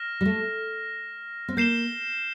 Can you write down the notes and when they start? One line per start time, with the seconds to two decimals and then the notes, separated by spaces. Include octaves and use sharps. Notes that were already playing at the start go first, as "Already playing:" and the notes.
Already playing: F6 A#6 E7
0.21 G3
0.25 A3
1.48 C4
1.57 A#3 G6 C7 E7 G7